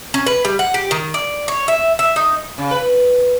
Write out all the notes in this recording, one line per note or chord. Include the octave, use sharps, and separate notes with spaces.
C#4
B4
G3
F#5
G4
D#3
D5
C#5
E5
E5
D#4
C#3
B4